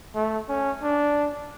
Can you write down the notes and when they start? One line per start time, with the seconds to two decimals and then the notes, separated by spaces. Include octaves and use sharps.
0.15 A3
0.48 C#4
0.82 D4